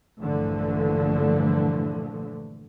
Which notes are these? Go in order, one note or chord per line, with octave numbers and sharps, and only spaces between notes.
A#1 G2 D3 E3 F3 A3